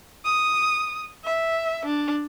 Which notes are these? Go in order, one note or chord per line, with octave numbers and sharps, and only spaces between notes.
D#6
E5
D4